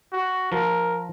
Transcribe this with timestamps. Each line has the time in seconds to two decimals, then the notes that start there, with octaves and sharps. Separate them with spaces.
0.13 F#4
0.52 F3 A#4